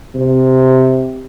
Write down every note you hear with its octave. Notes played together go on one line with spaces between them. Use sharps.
C3